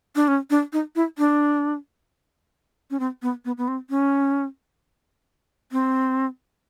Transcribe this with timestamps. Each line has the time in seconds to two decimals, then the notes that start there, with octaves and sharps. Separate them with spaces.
0.15 D4
0.28 C#4
0.50 D4
0.73 D#4
0.96 E4
1.18 D4
2.90 C#4
3.00 C4
3.22 B3
3.45 B3
3.58 B3
3.68 C4
3.90 C#4
5.72 C4